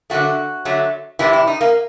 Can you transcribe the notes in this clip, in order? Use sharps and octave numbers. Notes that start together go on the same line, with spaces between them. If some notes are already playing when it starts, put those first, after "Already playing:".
D3 F#3 A3 F#4
D3 F#3 A3
C3 E3 G3 E4
E4
D#4
A#3